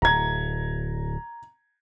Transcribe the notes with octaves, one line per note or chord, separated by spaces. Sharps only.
D1 A#5 G#6